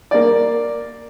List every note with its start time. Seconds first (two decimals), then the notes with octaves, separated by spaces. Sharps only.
0.11 A#3 D5